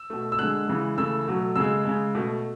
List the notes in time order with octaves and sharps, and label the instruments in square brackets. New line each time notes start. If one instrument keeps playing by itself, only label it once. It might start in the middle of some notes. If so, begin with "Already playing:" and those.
Already playing: [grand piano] E6
B2 A3
E6
D3 G#3 F#6
C#3 E3 G#3
C#3 E3 A3 E6
B2 F#3 A3
C#3 G#3 E6
C#3 G#3
B2 A3